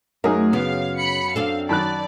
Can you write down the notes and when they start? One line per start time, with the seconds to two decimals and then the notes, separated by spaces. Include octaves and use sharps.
0.24 F#2 A3 D#4 G#4 A#4
0.53 C#3 B3 F5
0.97 B5 C#7
1.36 C4 D4 A4 F5
1.69 F#2 D#3 D5 A5 B5 F#6